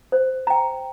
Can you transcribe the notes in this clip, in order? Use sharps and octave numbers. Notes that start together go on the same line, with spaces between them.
C5
G5 A#5